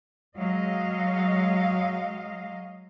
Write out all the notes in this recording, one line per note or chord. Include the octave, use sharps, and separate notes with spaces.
F#3 G#3 D#5 F5